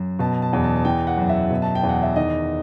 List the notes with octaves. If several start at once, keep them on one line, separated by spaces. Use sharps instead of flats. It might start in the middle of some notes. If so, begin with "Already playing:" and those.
Already playing: F#2
B2 A5
A5
E2
A5
A5
E3 G5
F#5
F#2
E5
B2
A5
G5
E2
F#5
E5
D#3 D#5